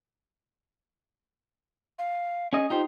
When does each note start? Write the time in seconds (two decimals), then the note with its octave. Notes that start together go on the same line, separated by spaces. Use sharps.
1.99 F5
2.53 C#4 G#4 D#5
2.70 D#4 F4 G4 C5